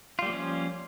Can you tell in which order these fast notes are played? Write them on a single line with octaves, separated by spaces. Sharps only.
F4 G3 A#3 F3 C#4